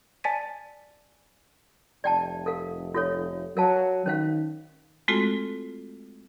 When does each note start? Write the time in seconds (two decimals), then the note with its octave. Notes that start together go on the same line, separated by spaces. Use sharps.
0.24 D5 G#5 A5 A6 B6 D#7
2.04 F1 D5 G5 A5
2.46 A4 A#4 F5
2.95 F4 A4 C#5
3.57 F#3 A#4 F5 A5
4.06 D#3 C#4 C5 F5
5.08 G#3 A3 C4 F4 F#4 A4